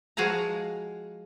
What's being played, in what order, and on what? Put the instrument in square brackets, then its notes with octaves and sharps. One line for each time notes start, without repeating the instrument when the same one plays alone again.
[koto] F3 G#3 F#4 G#4 F5 A#5